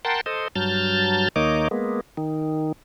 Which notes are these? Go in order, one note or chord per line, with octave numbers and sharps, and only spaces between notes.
A#4 F#5 G5 A5 C6
A4 C5 D#5
G2 F#3 A5 F6 G6 A6
D#2 A#3 D#4 C#5 D#5 D6
G#3 A#3 B3
D#3